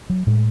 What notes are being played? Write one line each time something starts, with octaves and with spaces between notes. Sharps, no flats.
F#3
A2 G#3